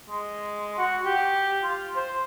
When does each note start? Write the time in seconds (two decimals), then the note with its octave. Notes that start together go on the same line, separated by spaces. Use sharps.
0.09 G#3
0.78 F#4
1.05 G4
1.63 F4
1.96 C5